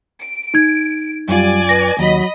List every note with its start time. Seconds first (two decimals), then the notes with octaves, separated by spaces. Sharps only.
0.20 D7
0.54 D#4 G#6
1.28 F#2 G3 F4 D5 G#5
1.69 B4 A#6
1.99 D#2 F#3 D#5 B5